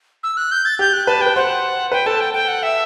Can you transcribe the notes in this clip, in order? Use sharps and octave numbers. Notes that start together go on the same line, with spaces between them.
E6
F#6
G6
A6
G4 G6
F#6
B4 A5
G5
B4
C5 F#5
B4 G5
A4 A5
G5
G5
F#5
E5